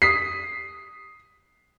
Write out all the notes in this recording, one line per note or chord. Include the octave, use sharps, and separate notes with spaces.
D#6 B6 C7